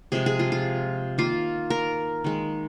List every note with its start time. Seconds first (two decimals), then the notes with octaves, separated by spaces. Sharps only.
0.12 C3 F3 G#3 G#4
0.26 G#4
0.39 F4
0.52 F4
1.18 D#3 A#3 F4
1.70 A#4
2.24 D#3 G#3